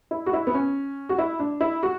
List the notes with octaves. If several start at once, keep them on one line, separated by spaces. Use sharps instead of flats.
E4
F#4
E4
B3
C#4
F#4
E4
D4
E4
F#4